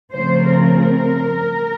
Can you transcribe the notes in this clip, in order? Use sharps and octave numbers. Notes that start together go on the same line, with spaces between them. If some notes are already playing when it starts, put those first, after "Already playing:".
C#3 F3 A3 C4 C5
A#4